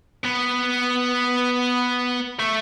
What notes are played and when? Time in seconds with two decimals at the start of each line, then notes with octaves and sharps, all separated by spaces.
0.24 B3
2.40 A3